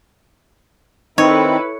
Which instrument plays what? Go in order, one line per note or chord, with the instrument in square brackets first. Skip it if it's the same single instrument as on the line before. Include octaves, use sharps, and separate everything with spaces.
[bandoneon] D#3 C4 [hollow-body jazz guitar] D#4 [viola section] E4 A4 B4 [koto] C#5